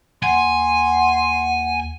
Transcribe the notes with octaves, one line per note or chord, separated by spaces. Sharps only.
D#2 F#5 G#5 C6